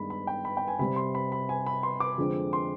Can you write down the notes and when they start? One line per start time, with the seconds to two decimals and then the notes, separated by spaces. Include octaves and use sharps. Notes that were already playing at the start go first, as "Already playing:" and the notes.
Already playing: G2 D#3 G#3 B3 B5
0.10 B5
0.27 G5
0.45 B5
0.57 G5
0.68 G#5
0.79 C3 G3 C4 B5
0.96 C6
1.15 B5
1.32 B5
1.49 G#5
1.66 B5
1.83 C6
2.00 D6
2.18 F2 D3 G#3 C4
2.53 C6